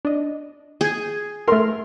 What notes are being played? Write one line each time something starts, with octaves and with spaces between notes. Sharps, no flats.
D4 D#5
G#4 G6 G#6
A3 A#4 C6 F6 C7